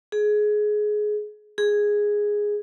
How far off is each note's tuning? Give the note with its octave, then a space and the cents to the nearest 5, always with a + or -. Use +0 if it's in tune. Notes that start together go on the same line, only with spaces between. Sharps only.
G#4 +20
G#4 -5